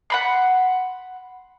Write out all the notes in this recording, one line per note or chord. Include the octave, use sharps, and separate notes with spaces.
F#5 B5 C6